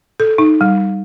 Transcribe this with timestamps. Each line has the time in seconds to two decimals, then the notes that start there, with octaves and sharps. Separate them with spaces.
0.20 A4
0.38 D#4
0.61 G3